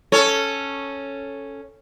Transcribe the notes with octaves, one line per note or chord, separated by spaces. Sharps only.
C#4 A4 C#5